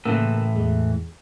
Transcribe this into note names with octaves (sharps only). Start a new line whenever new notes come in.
A2 C#3 E3 A#3 E6
E2 G#3